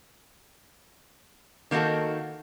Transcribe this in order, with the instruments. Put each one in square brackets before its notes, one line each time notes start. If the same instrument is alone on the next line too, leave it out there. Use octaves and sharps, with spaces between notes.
[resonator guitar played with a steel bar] D#3 A#3 D#4 F#4 A4